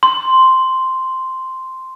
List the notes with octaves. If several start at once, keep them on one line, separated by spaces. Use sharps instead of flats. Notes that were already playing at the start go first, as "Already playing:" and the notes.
C6